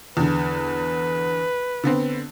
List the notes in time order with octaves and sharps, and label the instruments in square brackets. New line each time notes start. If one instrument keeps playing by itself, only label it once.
[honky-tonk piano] E2 D3 [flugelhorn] B4
[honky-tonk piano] D3 B3 C4